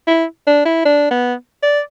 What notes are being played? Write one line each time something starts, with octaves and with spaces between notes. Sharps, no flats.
E4
D4
E4
D4
B3
D5